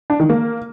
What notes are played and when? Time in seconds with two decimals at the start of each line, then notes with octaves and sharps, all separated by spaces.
0.10 D4
0.20 D#3
0.30 A#3